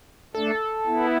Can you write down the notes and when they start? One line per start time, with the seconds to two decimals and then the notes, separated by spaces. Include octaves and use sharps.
0.35 A3 D4 A4
0.87 B3 E4